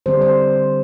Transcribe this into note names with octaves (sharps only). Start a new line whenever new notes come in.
D3 G3 C4 C5
C5